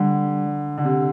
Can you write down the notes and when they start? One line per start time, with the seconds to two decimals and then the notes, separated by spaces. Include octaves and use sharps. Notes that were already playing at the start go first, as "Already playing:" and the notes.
Already playing: D3 G3
0.78 D3
0.85 C3